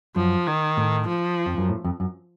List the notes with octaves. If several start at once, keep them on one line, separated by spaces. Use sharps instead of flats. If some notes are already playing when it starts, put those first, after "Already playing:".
F#2 F3
D#3
A2
F3
F2
F#2
A2
F2
F#2